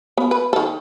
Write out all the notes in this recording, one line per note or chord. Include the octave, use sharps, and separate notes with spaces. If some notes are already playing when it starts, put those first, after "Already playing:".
B3
B4
D#3 A4